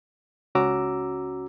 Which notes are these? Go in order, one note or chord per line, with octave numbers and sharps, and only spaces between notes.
C#2 C#4 F#4 A#5 D6 E6